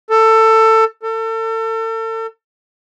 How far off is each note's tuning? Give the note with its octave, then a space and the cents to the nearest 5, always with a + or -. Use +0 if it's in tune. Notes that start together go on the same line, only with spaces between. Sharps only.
A4 +20
A4 +35